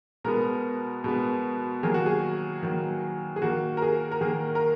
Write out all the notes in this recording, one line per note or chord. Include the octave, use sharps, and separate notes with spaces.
B2 G#3 B3 A#4
B2 G#3 B3
D#3 F#3 A#3 G#4
F#4
G#4
D#3 F#3 A#3
G#4
D#3 A#3 F#4
A#4
G#4
A#4
D#3 A#3 G#4
A#4